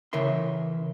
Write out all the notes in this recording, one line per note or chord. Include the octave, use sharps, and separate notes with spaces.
C#3 E3 A#4 E5 C6